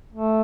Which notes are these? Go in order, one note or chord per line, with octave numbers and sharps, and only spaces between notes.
A3